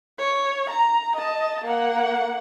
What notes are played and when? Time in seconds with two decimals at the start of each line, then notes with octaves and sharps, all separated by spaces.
0.18 C#5
0.70 A#5
1.15 D#5 A5
1.64 A#3 F#5